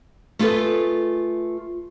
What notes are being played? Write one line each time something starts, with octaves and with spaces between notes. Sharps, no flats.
A3 F4 G#4 A4 B4